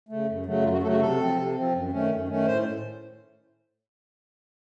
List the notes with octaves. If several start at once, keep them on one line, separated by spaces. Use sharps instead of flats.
C#3 A3
F#2
C#3 F#3 A3
F#2 F4
F#4
C#3 F#3 A3 A4
F#4
C3 A4
F3 C4
C3
F3 C4
F#2
D#3 A3 C#4
F#2
D#3 A3 C#4
A2 C5